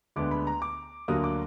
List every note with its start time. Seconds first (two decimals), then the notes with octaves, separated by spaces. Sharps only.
0.16 D2 D3 G#3 B3 D6
0.31 B5
0.47 A#5
0.62 D6
1.08 D2 D3 F#3 A#3 D#6
1.24 D6